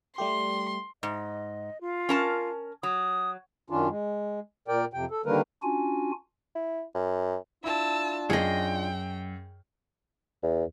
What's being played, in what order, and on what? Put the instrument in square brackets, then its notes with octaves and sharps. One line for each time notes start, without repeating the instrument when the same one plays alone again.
[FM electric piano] G3 A3 G4 [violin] C6
[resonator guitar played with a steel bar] G#2 [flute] D#5
[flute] F4
[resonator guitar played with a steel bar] C#4 A#4 A5
[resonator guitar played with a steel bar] F#3 [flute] D#6
[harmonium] F#2 D#3 C#4 D4 F4
G#3
A#2 A#4 D5 G5
F2 C3 G5
A4
D3 D#3 G3 A#3 A#4 B4
[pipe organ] C#4 D4 F4 F#4 G#5
[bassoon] E4
F#2
[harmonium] D4 F4 [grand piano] E4 [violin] A5 E6
[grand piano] F#2 [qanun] G#4 D#5 [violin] G5
[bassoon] E2